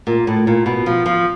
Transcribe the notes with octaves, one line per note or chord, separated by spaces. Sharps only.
A#2
A2
A#2
B2
F3
F3